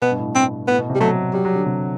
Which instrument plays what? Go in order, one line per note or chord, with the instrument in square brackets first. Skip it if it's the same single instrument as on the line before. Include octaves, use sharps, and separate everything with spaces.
[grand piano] B2 [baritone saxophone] B3
[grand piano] G2
A2
[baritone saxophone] C4
[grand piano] A2 [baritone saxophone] B3
[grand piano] B2
C3
[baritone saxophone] G3
[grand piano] F#3 [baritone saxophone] A3
[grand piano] F#3 [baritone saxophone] G3
[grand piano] F#3
D3
C3